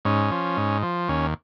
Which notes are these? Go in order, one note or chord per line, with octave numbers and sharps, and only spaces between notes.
G#2 C#4
F3
G#2
F3
D#2 C#4